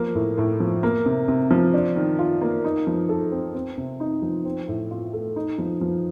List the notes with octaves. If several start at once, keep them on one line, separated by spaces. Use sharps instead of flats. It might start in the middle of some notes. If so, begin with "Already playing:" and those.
Already playing: F3 A#3
A2
A2
F3
A#3
C3
C3
F3
D4
D#3
F4
A#3
D#4
F3
A4
C4
C4
C3
D#4
F3
C4
A2
F4
A3
D#4
F3
F3